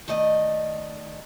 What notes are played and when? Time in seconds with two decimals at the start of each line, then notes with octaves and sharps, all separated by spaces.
0.08 D#3 A3 D5 D#5